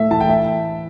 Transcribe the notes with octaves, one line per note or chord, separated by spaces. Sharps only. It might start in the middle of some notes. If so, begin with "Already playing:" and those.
Already playing: A2 A3 E5
E3 A5
G5
E5